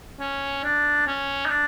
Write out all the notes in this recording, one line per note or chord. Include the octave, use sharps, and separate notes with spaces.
C#4
D4
C#4
D#4
D4